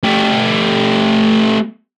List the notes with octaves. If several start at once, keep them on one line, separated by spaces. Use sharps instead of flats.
A3 G4